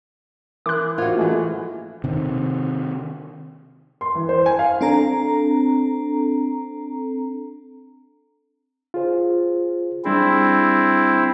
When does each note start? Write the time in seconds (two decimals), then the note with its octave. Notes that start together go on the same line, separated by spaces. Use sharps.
0.66 E3 A#4 C6 D6 F#6
0.98 F4 F#4 C5 F5 G#6
1.17 E3 G#3 A3 E5
2.04 C3 D#3
4.01 C6
4.15 E3
4.29 C5
4.46 G#5
4.59 F5
4.81 C4 D4 A4 A#5
8.94 F4 G#4 C5
10.05 G3 C4 D4 E4 G#4